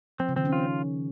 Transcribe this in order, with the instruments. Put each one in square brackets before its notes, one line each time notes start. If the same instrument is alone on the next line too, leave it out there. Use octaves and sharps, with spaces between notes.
[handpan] F3 [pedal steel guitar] C4
[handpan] C#3
[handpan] D#3 [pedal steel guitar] C4
[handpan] C#4
[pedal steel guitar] F4